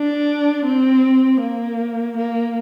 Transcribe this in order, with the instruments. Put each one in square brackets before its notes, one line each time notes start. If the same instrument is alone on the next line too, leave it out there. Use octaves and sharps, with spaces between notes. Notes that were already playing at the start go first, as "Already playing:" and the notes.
Already playing: [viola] D4
C4
A#3
A#3